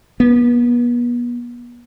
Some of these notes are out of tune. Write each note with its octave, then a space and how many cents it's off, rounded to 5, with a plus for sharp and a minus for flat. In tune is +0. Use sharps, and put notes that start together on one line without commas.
B3 -35